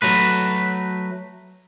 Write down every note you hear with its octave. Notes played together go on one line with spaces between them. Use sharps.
F#3 A3 B4